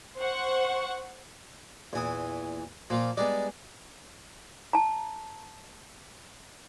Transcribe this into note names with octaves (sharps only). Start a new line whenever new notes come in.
C5 F#5 C#6
E2 A#2 E3 G#5 D#6
A#2 F3 A#3 F4
G3 G#3 B3 D4 D#4 D5
A5 A#5